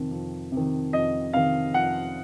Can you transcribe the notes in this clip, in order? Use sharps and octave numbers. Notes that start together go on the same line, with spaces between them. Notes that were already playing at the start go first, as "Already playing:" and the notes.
Already playing: F2 C3 D#3
F2
C3
D#3
F2 D#5
C3 D#3 F5
F2 F#5